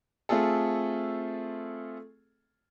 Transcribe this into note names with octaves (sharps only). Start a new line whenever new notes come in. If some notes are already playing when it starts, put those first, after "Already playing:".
A3 C4 F4 G#4 A4